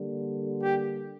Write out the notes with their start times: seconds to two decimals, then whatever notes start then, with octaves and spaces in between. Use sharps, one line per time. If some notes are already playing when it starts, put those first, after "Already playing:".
Already playing: D3 G3 A#3
0.62 G4